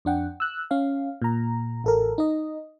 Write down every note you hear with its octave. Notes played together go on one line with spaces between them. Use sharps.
F2 D4 F#5 G5
E6 F#6
C#4 F5
A#2 A#5
A1 A4 A#4
D#4 D#5